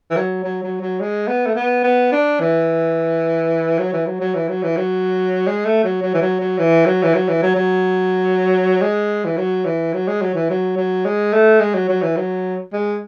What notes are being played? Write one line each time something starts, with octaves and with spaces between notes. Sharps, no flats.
E3
F#3
F#3
F#3
F#3
G#3
B3
A3
B3
B3
D4
E3
F#3
E3
F#3
F#3
E3
F#3
E3
F#3
G#3
A3
F#3
F#3
E3
F#3
F#3
E3
F#3
E3
F#3
E3
F#3
F#3
G#3
E3
F#3
E3
F#3
G#3
F#3
E3
F#3
F#3
G#3
A3
G#3
F#3
F#3
E3
F#3
G#3